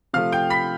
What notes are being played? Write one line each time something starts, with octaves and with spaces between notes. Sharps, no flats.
C3 F3 A3 F5 F6
G5 G6
B5 B6